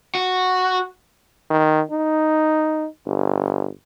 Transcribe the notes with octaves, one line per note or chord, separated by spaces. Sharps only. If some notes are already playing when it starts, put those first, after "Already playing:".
F#4
D#3
D#4
G1